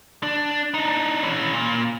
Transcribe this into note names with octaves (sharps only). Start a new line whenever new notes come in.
D4
D4 D#4
E3 C#4
A#2